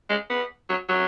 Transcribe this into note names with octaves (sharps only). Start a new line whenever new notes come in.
G#3
B3
F#3
F#3